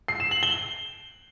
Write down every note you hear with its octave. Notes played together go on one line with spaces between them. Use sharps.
C7
E7
F#7
G7